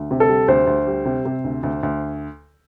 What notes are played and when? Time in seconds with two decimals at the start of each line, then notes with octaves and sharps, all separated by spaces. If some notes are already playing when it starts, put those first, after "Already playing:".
Already playing: D2
0.11 C3
0.20 A4
0.29 G3
0.48 D2 C5
0.67 D2
0.87 G3
1.05 C3
1.25 C3
1.44 D2
1.63 D2
1.83 D2